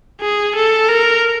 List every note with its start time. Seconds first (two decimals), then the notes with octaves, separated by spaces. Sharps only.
0.22 G#4
0.56 A4
0.89 A#4